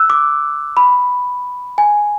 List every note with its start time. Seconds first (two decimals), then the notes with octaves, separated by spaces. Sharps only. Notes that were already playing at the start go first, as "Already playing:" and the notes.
Already playing: E6 F#6
0.10 D6
0.77 B5
1.78 G#5